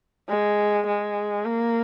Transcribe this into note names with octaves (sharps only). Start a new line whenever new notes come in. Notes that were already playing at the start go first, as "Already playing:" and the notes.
G#3
G#3
A#3